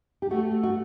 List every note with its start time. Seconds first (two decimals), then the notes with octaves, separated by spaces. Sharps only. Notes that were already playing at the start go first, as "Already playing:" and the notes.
0.22 G4
0.31 A3 F#4
0.63 F#4